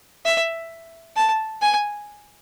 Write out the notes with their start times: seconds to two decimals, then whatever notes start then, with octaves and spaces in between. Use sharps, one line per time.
0.25 E5
1.16 A5
1.62 G#5